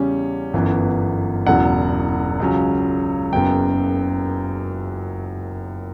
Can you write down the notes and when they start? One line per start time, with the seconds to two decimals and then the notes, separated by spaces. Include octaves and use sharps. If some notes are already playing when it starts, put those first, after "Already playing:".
Already playing: E2 C#3 G3 C#4
0.53 G1 F#2 E3 B3
1.47 E1 E2 C#3 F#3 F#5
2.40 C#2 C#3 F#3 C#4
3.33 F#1 F#2 C#3 F#3 B3 G5